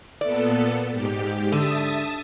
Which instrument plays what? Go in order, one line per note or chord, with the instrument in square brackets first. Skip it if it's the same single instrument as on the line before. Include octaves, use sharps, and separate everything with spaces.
[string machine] A#2 B3 A4 [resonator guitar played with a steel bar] D5
[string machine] G#2 G4
[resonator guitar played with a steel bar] D3 [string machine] E5 A5 D#6